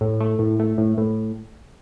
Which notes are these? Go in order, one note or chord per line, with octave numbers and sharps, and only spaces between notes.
A2
A3
A2
A3
A2
A2